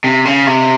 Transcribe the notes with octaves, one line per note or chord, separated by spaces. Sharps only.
C3
C#3
C3